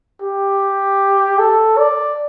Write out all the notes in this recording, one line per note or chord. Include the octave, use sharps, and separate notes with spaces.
G4
A4
D5